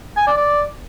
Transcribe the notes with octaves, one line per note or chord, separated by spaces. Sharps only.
G#5
D5
D5